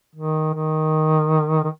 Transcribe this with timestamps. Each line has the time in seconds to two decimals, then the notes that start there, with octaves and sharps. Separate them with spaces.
0.15 D#3
0.54 D#3
1.64 D#3